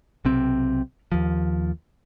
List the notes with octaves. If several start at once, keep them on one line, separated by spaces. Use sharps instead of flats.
B1 C3 C4
D#2 F3